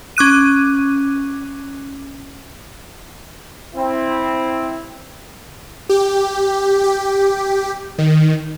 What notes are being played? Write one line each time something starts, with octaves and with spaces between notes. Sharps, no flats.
C#4 D6 F#6 D#7
C4 E4
G4
G4
D#3